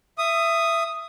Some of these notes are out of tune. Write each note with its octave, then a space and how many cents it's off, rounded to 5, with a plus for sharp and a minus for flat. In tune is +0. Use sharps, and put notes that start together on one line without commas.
E5 +20 D#6 +0